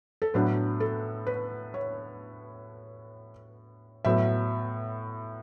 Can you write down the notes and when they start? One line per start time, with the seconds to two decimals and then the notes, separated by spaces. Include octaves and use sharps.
0.22 A4
0.34 A2 F#3 B3 D4 B4
0.80 A4
1.27 B4
1.74 C#5
4.05 A2 F#3 B3 E5